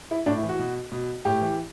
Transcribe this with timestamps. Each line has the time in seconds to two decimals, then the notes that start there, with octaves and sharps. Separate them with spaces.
0.11 E4
0.26 A2 D4
0.37 E4
0.43 E3
0.49 F#4
0.59 B2
0.92 B2
1.25 A2 G4
1.41 E3